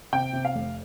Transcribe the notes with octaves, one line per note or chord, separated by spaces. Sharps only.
C3 G5
C3
F5
F1